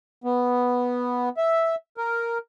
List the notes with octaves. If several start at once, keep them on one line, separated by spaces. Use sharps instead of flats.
B3
E5
A#4